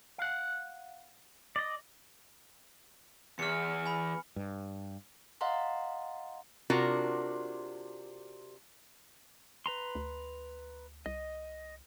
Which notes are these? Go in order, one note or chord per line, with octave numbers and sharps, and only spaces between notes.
F5 F#5
D5 D#5
E2 F6 C#7
G#5 B5
G2
D#5 F5 F#5 A#5 C6
C3 D4 F4 F#4 A#4
B4 A#5 C6
D2
C2 D#5